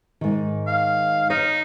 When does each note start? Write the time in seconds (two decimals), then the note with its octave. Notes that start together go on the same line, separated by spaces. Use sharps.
0.21 G#2 D#3
0.67 F5
1.30 D#4 C#5